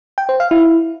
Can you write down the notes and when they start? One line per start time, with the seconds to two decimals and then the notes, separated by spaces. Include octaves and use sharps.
0.18 G5
0.29 C5
0.40 F5
0.51 E4